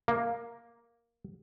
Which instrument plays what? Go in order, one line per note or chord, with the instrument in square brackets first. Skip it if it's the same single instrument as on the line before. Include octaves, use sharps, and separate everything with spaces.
[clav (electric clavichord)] A#3